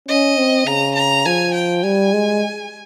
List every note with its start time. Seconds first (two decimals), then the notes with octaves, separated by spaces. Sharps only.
0.08 C#4 D#5
0.38 C4
0.66 C#3 A#5
0.95 A#5
1.25 F3 G#5
1.54 G5
1.83 G3 G#5
2.13 G#3